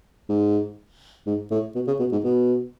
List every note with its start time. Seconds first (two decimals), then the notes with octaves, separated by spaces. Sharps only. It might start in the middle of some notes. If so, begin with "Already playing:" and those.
0.29 G#2
1.27 G#2
1.51 A2
1.75 B2
1.87 C#3
1.99 B2
2.12 G#2
2.24 B2